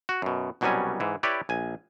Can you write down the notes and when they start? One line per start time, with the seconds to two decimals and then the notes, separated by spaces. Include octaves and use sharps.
0.09 F#4
0.22 F#2 B2
0.61 C2 B2 F#3 G3 C#4 G#5
1.00 G#2 E3
1.23 E4 G4 B4 C#5 D5
1.49 A#1 G#5